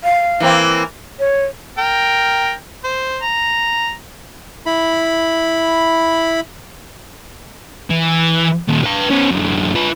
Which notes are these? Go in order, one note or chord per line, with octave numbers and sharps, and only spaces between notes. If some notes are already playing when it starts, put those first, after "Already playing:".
F5
E3 A#3 C4
C#5
A#4 G5
C5
A#5
E4 B5
E3
D#2 A#2
B4 F5
B3 C#4
F#2 D3
F4 B4